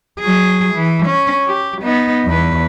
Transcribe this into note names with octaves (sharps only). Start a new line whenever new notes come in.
F#3 G#4
E3
C#4
G4
B3 D#4
E2 B4